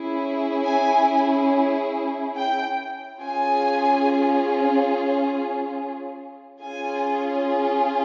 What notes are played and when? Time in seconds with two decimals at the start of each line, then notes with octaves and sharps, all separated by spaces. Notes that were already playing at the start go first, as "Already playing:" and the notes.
Already playing: C#4 E4 G#4
0.65 G#5
2.36 G5
3.21 C#4 F4 G#4 G#5
6.62 C#4 F4 G#4 G#5